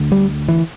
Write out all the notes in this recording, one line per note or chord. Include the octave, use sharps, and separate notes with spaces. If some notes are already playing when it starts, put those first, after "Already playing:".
Already playing: D2 D3
G3
E3